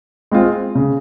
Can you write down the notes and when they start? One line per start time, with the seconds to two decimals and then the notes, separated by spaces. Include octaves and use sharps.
0.32 G#3 C4 F4
0.75 C#3